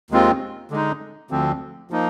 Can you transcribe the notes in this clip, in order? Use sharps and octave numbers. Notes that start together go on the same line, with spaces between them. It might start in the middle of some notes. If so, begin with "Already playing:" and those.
D#2 D#3 G#3 C4 F4
D3 G#3 D#4
D2 D3 F3 C4
F3 A#3 D#4